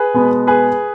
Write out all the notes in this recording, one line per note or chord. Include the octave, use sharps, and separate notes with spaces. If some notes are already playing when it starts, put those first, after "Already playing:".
Already playing: G#4 B4
B2 G#3 B3
G#4 B4